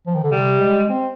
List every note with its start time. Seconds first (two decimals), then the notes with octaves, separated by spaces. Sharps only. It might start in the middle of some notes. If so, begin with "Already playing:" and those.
0.07 F3
0.15 D#3
0.23 D3
0.32 C3 G3
0.60 G#3
0.89 C4